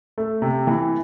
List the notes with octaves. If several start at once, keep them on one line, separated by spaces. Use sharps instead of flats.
A3
C3
E3